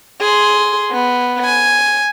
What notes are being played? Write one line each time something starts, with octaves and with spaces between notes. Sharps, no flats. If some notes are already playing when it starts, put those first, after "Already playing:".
G#4 C6
B3
G#5